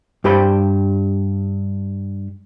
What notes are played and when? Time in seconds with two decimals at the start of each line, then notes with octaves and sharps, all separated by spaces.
0.24 G2 G4 C5 B5